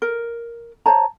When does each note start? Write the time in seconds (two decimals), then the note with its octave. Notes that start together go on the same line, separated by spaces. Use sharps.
0.02 A#4
0.86 C5 C#5 A5 A#5